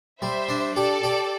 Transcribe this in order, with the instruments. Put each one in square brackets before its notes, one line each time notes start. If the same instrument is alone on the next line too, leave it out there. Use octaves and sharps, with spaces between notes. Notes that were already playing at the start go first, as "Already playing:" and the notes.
[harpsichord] G3 [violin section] C5 E5
[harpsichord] D4
[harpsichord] G4 [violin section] A4 D5
[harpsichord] G4